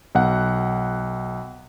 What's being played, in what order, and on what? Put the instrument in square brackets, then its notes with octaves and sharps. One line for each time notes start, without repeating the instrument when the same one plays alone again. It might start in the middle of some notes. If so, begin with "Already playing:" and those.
[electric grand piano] B1 F#5